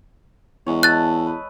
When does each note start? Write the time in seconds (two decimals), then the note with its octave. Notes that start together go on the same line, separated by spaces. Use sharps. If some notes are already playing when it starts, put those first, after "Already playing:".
0.66 E2 G#3 C#5
0.83 A4 D#5 F#6 A6
1.26 B4